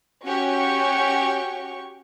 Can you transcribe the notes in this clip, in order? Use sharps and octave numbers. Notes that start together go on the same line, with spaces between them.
C#4 F#4 G4 C#6